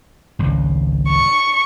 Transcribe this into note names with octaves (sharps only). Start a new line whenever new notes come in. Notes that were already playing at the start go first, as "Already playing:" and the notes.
G#1 C#2
C#6